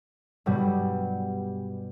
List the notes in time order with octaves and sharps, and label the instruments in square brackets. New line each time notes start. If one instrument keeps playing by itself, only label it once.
[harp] G2 B2 G3